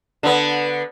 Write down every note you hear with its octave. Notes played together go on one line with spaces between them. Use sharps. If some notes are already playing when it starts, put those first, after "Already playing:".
D3 B3